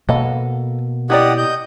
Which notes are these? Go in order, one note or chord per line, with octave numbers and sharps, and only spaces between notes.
B2 A#3 A4 D#5 F5
E4 G4 A#4 D5 D#5 F#5
D#5 G6